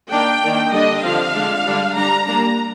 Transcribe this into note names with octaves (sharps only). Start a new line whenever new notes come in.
D#3 A#3 D4 G5
D#3 A#3 D4
D3 G3 D4 D#5
D3 F3 C4 F5
D3 G#3 D4
D3 G3 D4
G3 D4 A#5
G3 A#3 D4 A#5